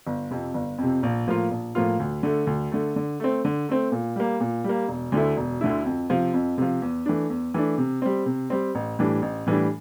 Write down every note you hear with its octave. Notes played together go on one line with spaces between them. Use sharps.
G1
F2 C3
G1
F2
C3
A#1
A2 F3 A#3 F4
A#1
A2 F3 A#3 F4
D2
D3 A3
D2
D3 A3
D3
A3 C4
D3
A3 C4
A#2
G3 A#3
A#2
G3 A#3
E1
D2 D3 A3 E4
E1
D2 D3 A3 E4
F2
C3 F3
F2
C3 F3
E2
E3 A3 D4
E2
E3 A3 D4
C3
G3 C4
C3
G3 C4
A1
A2 E3 G3 D4
A1
A2 E3 G3 D4